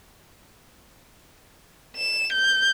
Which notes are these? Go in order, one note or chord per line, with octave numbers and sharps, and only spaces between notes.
E7
G6